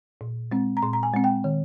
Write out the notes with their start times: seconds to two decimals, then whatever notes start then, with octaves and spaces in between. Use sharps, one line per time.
0.21 A#2
0.52 G#3 C4
0.77 A#5
0.82 A#2 C6
0.93 A#5
1.03 G#5
1.14 G#3 C4
1.24 G5
1.44 D#3